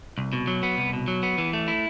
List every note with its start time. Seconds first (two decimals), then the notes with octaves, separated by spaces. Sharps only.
0.18 C2
0.33 B2
0.47 F#3
0.63 B3
0.77 C2
0.93 B2
1.08 F#3
1.23 B3
1.38 E3
1.53 A3
1.68 E4